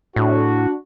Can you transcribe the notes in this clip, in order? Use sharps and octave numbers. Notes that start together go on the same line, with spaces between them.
A2 D4 F#4